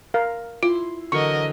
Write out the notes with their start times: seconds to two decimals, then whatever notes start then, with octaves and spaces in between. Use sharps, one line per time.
0.14 A#4 F5
0.63 E4 F4 C6
1.12 D3 E3 F#3 A#4 D#5 C#6